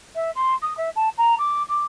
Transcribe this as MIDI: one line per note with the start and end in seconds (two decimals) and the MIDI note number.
0.15 0.30 76
0.35 0.54 84
0.62 0.76 87
0.77 0.89 76
0.95 1.09 81
1.17 1.34 82
1.38 1.62 86
1.68 1.85 86